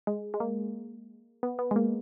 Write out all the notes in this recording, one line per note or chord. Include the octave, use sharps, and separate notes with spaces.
G#3
G#3
A#3
B3
B3
G#3
A#3